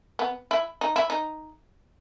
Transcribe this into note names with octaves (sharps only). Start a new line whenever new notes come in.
B3
E4
D#4
E4
D#4